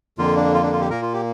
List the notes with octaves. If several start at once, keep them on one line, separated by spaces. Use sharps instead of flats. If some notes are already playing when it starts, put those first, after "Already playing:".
F2 D3 A#3 F4
D4
F4
D4
F4
G4
A#2 A#3 A#4
F4
G4